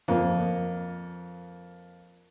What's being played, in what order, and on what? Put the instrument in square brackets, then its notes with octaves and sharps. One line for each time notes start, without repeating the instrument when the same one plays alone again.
[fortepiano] F2 A#3